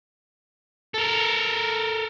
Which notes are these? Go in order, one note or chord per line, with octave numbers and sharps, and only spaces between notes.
A4 A#4